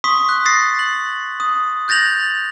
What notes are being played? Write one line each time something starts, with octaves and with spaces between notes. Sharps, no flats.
C6 C#6 D#6 B6
F#6
D#6 A6 A#6 C7
F#7
D#6
F#6 G6 A6 A#6 F7 F#7